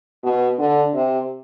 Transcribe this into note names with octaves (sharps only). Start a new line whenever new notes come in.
B2
D3
C3